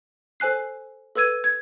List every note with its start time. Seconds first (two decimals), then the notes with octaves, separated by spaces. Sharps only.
0.40 A4 C5 G#5 F#6 C7
1.15 A4 B4 E6 G#6 D#7
1.44 G#6